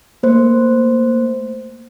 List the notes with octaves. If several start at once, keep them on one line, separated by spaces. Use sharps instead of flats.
A3 A#3 C5